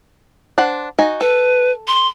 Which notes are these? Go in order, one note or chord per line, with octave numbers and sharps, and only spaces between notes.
D4 C5 F#5
D#4 F#4 G#5
A4 B4
C6